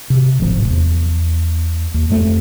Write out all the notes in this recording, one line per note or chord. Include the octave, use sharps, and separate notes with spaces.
C3
D1 G#1 F3
E2
D#2
F2 A3